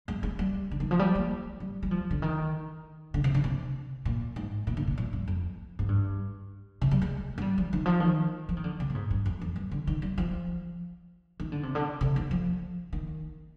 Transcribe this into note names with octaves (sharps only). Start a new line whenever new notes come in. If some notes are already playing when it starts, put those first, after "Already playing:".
G#3
G#3
G3
D3
D#3
F3
G3
A#3
G3
G3
F3
D3
D#3
D3
C3
D3
C3
A#2
G#2
A#2
D3
A#2
A#2
G2
F2
G#2
G2
C3
G3
G#3
G#3
G3
F3
D#3
F3
D#3
F3
D#3
D3
C3
A#2
G#2
G2
F2
F2
G2
D3
D#3
G3
F3
D#3
D3
C3
D3
C3
D#3
F3
D#3